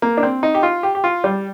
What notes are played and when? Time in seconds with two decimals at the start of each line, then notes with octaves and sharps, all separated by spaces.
0.02 A#3
0.17 D4
0.23 C4
0.43 D#4
0.55 G4
0.63 F4
0.83 G4
0.95 G4
1.04 F4
1.24 G3